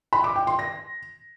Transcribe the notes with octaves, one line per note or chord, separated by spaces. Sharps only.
B5
D6
G5
C6
A#6